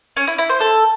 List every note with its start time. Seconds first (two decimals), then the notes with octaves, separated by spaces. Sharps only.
0.17 C#4
0.27 E4
0.38 E4
0.49 C5
0.60 A4